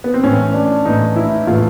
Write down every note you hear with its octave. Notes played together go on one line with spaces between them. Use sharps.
B3
C4
A2 E3 C#4
D4
A2 E3 D#4
E4
A2 E3 F4